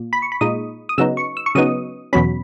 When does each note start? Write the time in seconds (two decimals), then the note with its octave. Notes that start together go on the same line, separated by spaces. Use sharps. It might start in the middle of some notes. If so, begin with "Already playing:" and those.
Already playing: A#2
0.13 B5
0.22 C#6
0.32 B5
0.41 A#2 G#3 D#4 D#6
0.89 D#6
0.98 C#3 F#3 B3 D#4 E6
1.17 C#6
1.37 E6
1.46 C#6
1.55 C#3 F#3 B3 D#4 D#6
2.13 E2 B2 F#3 C#4 B5